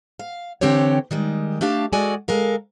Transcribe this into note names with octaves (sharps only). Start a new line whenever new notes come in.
F5
D3 E3 C4 G4 C5 C#5
D#3 G3 G#3
A3 D4 G4 F5 A5
G#3 F#4 A4 D5 G#5
G#3 A4 A#4 F5